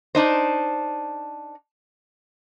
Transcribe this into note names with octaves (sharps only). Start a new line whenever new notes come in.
D4 D#4 C5